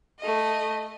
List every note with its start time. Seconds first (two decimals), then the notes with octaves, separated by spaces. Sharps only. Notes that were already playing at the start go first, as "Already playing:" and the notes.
0.20 A3 D#5